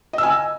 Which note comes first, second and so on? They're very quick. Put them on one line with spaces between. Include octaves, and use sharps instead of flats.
D#5 E6 G#5